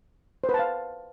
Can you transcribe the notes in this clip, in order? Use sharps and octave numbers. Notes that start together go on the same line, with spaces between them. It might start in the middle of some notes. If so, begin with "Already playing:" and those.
C5
B4
A5
F5